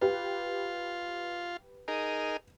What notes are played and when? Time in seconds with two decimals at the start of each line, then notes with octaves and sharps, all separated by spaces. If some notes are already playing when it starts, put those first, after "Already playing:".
0.01 F4 G4 B4
1.88 D#4 G#4 A#4